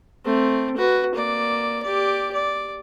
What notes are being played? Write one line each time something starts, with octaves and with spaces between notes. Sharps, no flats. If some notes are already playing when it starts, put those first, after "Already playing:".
A3 C4
F#4 B4
A#3 D5
G4 D5
D5